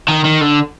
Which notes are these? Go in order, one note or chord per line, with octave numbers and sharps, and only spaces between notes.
D#3
D#3
D3